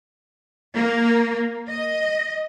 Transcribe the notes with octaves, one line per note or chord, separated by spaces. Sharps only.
A#3
D#5